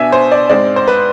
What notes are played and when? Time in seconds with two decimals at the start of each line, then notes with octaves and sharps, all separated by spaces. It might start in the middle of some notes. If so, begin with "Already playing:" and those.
Already playing: B2 B3 D4 E5 G#5
0.12 C5
0.32 D5
0.50 G#2 G#3 C4 D5
0.76 C5
0.88 B4